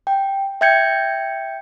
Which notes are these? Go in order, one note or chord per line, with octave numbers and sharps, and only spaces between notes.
G5
E5 G5 G6 G#6 C#7